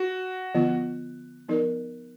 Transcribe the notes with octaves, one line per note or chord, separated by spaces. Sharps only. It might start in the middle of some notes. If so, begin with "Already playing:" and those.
Already playing: F#4
D3 F3 B3 F4
F3 B3 D#4 A#4 D5